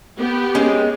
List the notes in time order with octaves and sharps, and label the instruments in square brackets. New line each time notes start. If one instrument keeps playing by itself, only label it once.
[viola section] B3 G4
[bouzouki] G#3 C4 [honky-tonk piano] C#4